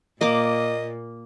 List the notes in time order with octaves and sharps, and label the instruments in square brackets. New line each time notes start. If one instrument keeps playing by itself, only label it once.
[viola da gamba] A#2 [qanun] A#3 D6 [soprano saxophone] D#5